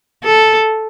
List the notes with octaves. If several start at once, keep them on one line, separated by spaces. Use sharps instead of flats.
A4